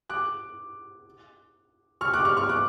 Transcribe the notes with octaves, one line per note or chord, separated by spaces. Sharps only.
D6 F#6
C#6 F6
D6 F#6
C#6 F6
C#6 F6
D6 F#6